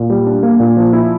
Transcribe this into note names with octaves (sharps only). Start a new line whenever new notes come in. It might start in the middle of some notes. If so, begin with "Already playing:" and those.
Already playing: A#2
G3
D4
A#3
A#2
F3
E4